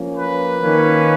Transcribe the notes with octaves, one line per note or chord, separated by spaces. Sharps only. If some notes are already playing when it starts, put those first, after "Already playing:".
Already playing: F3 A#3 C#4
B4
D#3 A#3 C#4